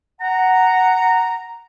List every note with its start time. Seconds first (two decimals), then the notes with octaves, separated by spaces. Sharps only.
0.21 F#5 A#5